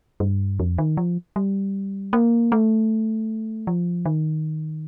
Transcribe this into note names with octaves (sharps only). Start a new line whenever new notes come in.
G2
F2
D#3
F3
G3
A#3
A3
F3
D#3